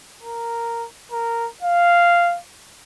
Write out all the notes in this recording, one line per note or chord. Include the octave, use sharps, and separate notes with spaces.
A#4
A#4
F5